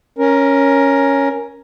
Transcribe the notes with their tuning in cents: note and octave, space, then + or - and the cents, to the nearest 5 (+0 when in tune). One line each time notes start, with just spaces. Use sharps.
C#4 +0 A#4 +10